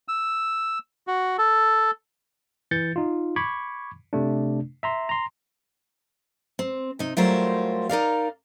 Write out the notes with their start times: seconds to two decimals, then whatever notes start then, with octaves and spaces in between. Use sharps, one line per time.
0.08 E6
1.07 F#4
1.38 A4
2.71 E3 G6 A6 C#7
2.96 D#4 F4
3.36 B5 C#6 D6 G#6
4.13 C3 A3 D4
4.83 E5 A#5 C6
5.09 A#5 C6
6.59 C4
6.99 C3 D#4
7.17 F#3 G3 A3 F4 A#4 C5
7.89 D#4 A#4 D5 F5